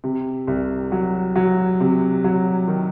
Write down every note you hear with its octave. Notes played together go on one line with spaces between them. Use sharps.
C3
C2
F#3
F#3
C3
F#3
D#3